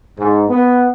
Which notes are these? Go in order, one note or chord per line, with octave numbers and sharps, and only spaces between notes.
G#2
B3